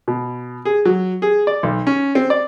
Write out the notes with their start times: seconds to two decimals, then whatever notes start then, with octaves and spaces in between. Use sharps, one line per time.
0.08 B2
0.65 G#4
0.85 F#3
1.22 G#4
1.47 D5
1.63 B1
1.87 C#4
2.15 C4
2.30 D5